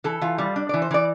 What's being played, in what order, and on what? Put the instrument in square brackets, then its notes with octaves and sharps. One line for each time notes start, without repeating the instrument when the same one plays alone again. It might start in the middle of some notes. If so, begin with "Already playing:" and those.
[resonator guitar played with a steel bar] E3 A4
E3 F4
G3 F4
D4
E3 D5
C5
E3 D5